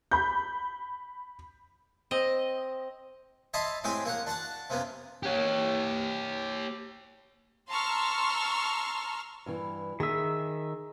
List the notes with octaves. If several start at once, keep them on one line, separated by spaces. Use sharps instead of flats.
B5 G6
C4 D#5
C#5 D#5 E5 A5 B5 C6
A2 G#3 C4 G4 G5 G#5
A#3 C#5 F#5
D4 F#4 F#5 A5
C3 A#3 B3 C#4
G4 C#5
A5 A#5 C6 C#6 E6 F6
G2 E3
D#3 G#4 E5